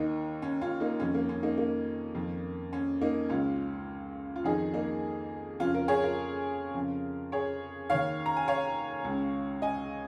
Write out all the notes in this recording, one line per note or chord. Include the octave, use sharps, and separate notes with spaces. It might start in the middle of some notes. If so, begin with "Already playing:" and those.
Already playing: D#2 D#3 A#3 D#4
C#4
C#4 F4
A#3 D#4
F2 D#3 C#4
A#3
C#4
A#3 D#4
A#3
F2 D#3
C#4
A#3 D#4
C#2 C#3 C#4 F4
F4
F2 D#3 D#4 G#4
A#3 D#4
F2 C#3 C#4 F4
F4 A#4
G#4 C#5
F4 A#4
F2 C#3
G#4 C#5
D#2 D#3 C#5 F5
A#5
G#5
C#5 F5
C#2 C#3
D#5 G#5